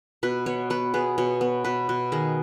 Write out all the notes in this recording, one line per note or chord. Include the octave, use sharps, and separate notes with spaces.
B2 B4
B3 C#5
B3 B4
B3 G#4
B2 C#5
B3
B2 B4
B2
D#3 G#4